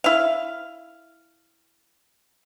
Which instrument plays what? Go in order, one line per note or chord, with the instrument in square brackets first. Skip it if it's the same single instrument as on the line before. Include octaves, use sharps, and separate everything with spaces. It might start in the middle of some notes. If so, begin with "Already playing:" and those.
[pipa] E4 F5